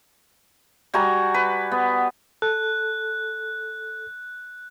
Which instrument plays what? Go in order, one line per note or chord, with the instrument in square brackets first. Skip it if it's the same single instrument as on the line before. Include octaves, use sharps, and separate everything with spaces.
[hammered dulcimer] G3 F#4 G#5 A#5
B4
B3
[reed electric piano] A4 [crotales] F#6